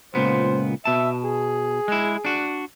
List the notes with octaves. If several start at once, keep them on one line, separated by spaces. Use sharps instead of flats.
C#2 A#2 B3 C5
B2 E5 A5
G#4
G#3 E4
D4 F#4